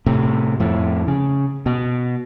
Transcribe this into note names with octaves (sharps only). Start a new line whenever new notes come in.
A2 C3
F2 A2
C#3
B2